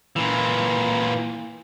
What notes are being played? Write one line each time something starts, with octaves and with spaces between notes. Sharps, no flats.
A#2 E3